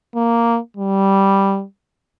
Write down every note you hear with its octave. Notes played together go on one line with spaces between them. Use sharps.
A#3
G3